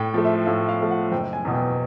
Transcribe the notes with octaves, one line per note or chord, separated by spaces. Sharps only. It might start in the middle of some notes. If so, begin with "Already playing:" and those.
Already playing: A2 G5
F3 A3
E5
A2 F5
F5
F3 A3
F#5
F#1 G5
G#5
E2 B2
G5